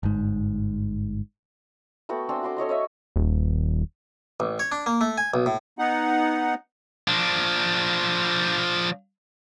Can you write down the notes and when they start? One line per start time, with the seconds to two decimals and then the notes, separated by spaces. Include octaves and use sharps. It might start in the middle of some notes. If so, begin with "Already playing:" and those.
0.03 G1 G#2
2.09 A3 B3 F#4 G5
2.29 C4 D4 G#5 E6
2.43 F#4 C6 D6
2.57 A4 C#5 D#5 C6
2.69 C#5 D#5 E5
3.16 D#1
4.40 A1
4.59 C#5
4.72 D4
4.86 A#3
5.01 A3
5.18 G#5
5.34 B1
5.46 A2
5.79 B3 D#4 F#5
7.08 F3 D4